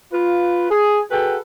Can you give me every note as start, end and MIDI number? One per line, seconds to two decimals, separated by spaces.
0.12 0.68 65
0.12 0.68 71
0.70 1.01 68
1.11 1.37 66
1.11 1.37 68
1.11 1.37 69
1.11 1.37 71
1.11 1.37 78
1.11 1.37 79